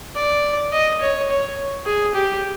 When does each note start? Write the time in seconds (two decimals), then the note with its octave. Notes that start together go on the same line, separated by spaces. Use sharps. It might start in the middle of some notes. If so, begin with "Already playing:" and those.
0.16 D5
0.72 D#5
1.01 C#5
1.30 C#5
1.86 G#4
2.15 G4